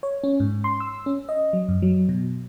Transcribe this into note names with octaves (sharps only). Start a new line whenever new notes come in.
C#5
C#4
G#2
C6
E6
C#4
D#5
F#3
F#2
F#3
B2